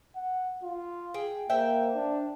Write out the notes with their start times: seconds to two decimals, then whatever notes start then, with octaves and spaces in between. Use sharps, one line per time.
0.16 F#5
0.63 F4
1.14 G#4 G5
1.49 A#3 C5 E5 G5
1.95 D4